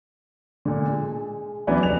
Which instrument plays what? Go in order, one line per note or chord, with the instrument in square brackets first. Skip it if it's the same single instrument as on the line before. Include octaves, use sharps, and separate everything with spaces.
[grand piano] A#2 D3
G#3
E3 F#3 B3 C#4 D4 E4
F1 F7